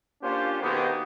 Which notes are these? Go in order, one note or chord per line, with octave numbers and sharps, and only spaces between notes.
A#3 C#4 D4 F4 G4 C5
B2 D#3 A#3 B3 G4 G#4